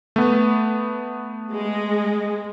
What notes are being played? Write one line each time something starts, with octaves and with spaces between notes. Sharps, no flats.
A3 B3
G#3